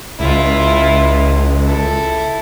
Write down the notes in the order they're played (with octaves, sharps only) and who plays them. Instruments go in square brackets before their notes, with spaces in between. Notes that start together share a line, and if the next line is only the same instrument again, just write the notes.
[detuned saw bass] C#2 [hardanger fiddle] E4 F4
[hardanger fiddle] E4 A4